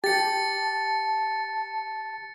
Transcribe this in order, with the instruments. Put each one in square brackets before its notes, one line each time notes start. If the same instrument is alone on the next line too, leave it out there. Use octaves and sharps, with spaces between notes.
[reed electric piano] G4 [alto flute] A5 [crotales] A6 C#7